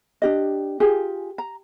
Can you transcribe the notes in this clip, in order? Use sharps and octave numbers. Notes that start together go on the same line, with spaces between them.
D4 G4 D#5
F4 G4 G#4 G#5
A#5